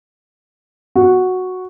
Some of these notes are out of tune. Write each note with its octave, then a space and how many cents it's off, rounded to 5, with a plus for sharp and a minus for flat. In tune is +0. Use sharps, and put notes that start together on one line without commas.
F#4 -5